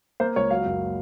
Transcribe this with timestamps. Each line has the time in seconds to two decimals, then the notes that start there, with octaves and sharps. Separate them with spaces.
0.20 A#3 C5
0.36 C#2 C#5
0.51 F#3 F5
0.65 F#1